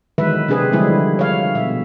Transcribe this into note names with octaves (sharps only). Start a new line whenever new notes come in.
D#3 E3 F#3 G#3 B4 E5
C3 C4 D4 G#4 B4
D3 F3 G3 G#3 E4 G#4
C#5 F5
B2 E5